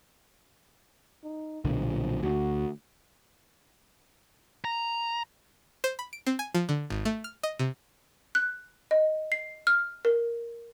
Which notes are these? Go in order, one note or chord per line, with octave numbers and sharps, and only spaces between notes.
D#4
B1 A#2 D3 F3
D2 F#4
A#5
C5
B5
D7
C4
G#5
F3
D3
G#1
A3
F6
D#5
C3
F#6
D#5
C7
F6
A#4